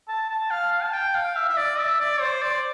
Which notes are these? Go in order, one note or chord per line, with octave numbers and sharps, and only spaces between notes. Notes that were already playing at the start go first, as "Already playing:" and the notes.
A5
A5
F5
F5
A5
G5
F5
E5
E5
D5
E5
D5
C5
D5